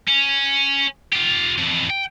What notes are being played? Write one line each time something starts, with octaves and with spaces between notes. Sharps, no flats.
C#4
F4 G4
F2 E3
G5